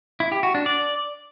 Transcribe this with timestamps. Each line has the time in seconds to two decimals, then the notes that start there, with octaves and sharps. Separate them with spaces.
0.20 E4
0.32 G4
0.43 F#4
0.55 D4
0.66 D5